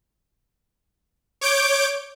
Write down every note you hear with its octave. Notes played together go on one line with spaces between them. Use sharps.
C#5 D6 G6 D7